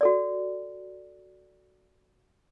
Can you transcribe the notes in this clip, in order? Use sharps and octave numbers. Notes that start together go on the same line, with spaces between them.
F#4 A4 D5